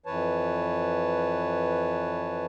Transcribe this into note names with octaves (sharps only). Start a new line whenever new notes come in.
F2 E3 B4 C#5 A5